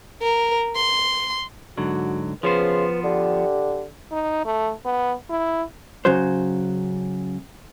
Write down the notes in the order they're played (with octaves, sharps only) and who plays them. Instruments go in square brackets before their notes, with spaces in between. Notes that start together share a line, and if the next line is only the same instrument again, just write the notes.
[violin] A#4
C6
[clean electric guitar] G#2 D3 F#3 [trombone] F#4
[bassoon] C#3 [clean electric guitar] F3 B3 C5 [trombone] B4
[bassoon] D3 [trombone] G4
[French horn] D#4
A3
B3
E4
[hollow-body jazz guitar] C#3 F#3 C5